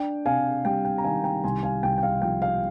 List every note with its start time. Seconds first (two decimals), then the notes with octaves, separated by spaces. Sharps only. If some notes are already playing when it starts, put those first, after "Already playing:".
Already playing: D4 G5
0.26 C3 F5 G#5
0.65 G3 G5
0.85 G5
0.98 A#5
1.04 D#3 F5 G#5
1.24 G5 A#5
1.44 C2 G#5 C6
1.63 F5 G#5
1.83 C2 G5
1.98 G5
2.03 F5
2.22 F3 G5
2.42 F5